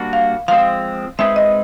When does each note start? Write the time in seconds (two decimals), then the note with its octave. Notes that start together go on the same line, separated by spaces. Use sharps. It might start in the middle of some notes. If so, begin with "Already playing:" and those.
Already playing: G3 A#3 D4 F#4
0.13 F5
0.48 F3 G#3 C4 F5
1.19 G#3 C4 D#4 G#4 B4 E5
1.36 D#5